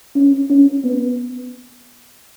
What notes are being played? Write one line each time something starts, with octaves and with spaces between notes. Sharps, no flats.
C#4
C#4
B3